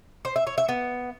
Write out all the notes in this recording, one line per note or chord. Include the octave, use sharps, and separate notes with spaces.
C5
E5
C#5
E5
B3